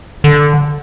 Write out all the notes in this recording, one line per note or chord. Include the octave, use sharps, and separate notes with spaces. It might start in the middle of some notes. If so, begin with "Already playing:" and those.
D3